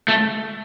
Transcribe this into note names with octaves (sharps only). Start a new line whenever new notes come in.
A3